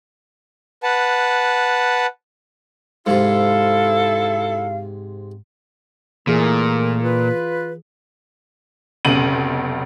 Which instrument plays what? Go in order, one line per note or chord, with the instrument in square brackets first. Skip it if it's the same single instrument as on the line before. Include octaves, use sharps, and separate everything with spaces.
[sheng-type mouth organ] B4 F#5 A5
[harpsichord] G#2 C3 [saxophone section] E4 A4 [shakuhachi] F5
[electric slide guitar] A#2 [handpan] E3 G#4 [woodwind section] A3 A#4
[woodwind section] F4 B4
[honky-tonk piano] F1 B1 C#3 D#7 F#7